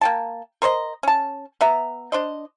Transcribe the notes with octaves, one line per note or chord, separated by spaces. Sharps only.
A#3 G5 A5
A#4 C5 C#5 D#5
C#4 A5
B3 E5 A#5
D4 C5 D#5